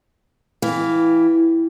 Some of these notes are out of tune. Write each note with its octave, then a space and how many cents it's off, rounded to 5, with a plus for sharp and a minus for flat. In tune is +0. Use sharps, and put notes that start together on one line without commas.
E3 +0 G4 +0 F5 +0